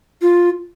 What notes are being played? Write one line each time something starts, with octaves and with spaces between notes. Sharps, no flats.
F4